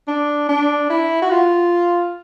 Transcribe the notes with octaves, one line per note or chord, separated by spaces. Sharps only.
D4
D4
E4
F#4
F4